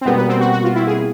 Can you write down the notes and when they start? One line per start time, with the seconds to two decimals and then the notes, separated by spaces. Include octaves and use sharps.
0.01 C4
0.05 B2 G3 A#3 B3
0.17 B3
0.29 C4
0.40 F#4
0.52 F#4
0.64 F4
0.75 E4
0.87 G#4